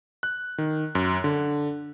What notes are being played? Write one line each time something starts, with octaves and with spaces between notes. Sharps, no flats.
F#6
D#3
F#2
D3